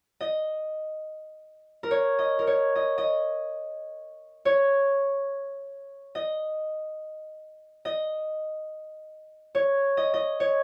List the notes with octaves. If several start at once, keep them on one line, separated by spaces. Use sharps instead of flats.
D#5
A#4
C#5
D#5
A#4
C#5
D#5
D#5
C#5
D#5
D#5
C#5
D#5
D#5
C#5